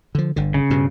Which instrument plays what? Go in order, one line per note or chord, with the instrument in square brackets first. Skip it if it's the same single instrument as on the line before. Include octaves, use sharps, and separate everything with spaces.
[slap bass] D3 F3
G1 D3
[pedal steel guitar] C#3
[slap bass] G2 B2